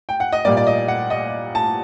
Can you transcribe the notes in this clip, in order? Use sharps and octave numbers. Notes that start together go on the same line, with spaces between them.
G5
F#5
D#5
A#2 G3 A#3 D5
D5
D#5
F#5
D#5
A5